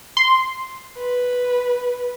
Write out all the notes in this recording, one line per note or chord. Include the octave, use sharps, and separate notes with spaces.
C6
B4